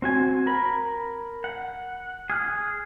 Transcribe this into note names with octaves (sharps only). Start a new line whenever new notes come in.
C4 F#4 G#5
A#4 B5
F#5
G#4 F6 F#6